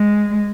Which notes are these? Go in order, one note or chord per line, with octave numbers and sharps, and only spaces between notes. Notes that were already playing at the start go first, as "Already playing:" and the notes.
Already playing: G#3